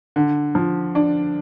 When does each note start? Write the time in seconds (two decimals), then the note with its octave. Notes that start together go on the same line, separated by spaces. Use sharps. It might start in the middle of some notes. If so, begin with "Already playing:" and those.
0.16 D3
0.55 F3
0.95 D4